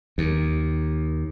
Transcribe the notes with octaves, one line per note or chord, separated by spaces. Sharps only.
D#2